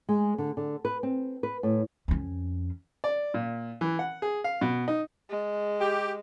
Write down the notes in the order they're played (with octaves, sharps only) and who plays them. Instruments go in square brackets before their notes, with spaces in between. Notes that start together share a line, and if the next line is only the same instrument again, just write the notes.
[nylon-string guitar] G#3
D3
D3
B4
C4
B4
A2
[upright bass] F2 C#4
[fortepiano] D5
A#2
E3
F#5
G#4
F5
B2
D#4
[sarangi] G#3
[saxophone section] G4